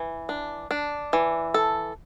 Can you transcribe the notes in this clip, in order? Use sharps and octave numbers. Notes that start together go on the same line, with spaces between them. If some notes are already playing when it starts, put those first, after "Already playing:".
Already playing: E3
D4
D4
E3
A4